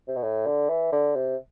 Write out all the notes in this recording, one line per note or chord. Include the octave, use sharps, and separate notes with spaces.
C3
B2
A2
D3
E3
D3
C3